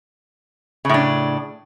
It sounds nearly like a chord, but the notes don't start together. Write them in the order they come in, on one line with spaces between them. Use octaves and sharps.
C#3 A2 D4